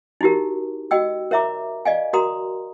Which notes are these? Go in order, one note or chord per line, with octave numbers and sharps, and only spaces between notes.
D#4 E4 F#4 G4 A#4
F#4 D#5 G5 E6
A#4 C#5 E5 A#5 D6
D5 D#5 F5 G#5
F#4 A#4 A#5 C6 D#6